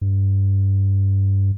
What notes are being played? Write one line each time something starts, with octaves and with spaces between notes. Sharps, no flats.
G2